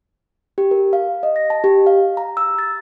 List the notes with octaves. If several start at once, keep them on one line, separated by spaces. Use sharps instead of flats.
G4
A#4
F5
D#5
A#6
A5
G4
F5
A#5
E6
A6